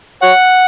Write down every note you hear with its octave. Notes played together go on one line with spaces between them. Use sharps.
C#5 F#5